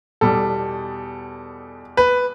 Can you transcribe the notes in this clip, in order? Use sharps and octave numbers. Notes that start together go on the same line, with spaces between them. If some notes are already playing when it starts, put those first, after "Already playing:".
E2 B2 G3 A4
B4